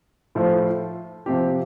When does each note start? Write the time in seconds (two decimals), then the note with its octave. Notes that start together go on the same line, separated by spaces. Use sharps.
0.35 A2 F3 A3 F4 C5
1.26 C3 F3 C4 G4